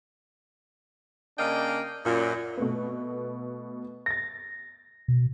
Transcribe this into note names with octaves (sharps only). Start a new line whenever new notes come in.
C#3 A#3 D4 D#5 F5 G5
F#2 A#2
B2 A3 B3
A6 A#6
B2